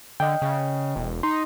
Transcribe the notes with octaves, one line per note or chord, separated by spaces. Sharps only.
D3 D#5 G5
C#3
E1
D#4 C6